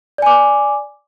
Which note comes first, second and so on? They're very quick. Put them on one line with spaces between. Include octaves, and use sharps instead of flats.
D5 G#5 D6